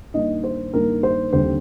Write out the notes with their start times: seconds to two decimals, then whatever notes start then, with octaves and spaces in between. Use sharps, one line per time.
0.14 G2 D#3 A#3 D4 D#4 D#5
0.44 C5
0.73 G2 D#3 A#3 D4 A#4
1.03 C5
1.33 D#2 D3 G3 C4 C5